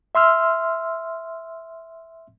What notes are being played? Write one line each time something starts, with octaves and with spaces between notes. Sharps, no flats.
E5 C6 E6 F6